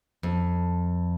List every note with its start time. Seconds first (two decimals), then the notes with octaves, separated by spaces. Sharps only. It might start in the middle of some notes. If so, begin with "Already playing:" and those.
0.23 F2